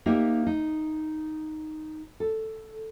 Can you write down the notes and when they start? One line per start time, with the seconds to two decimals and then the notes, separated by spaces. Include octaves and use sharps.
0.06 A#3 D#4 G4 C5 E5
0.47 D#4
2.20 A4